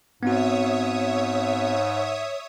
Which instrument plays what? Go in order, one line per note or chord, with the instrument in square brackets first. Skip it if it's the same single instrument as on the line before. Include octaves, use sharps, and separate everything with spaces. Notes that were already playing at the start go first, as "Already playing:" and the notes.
[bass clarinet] G#2 [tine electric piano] B3 C4 F#4 [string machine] C#5 E5 D#6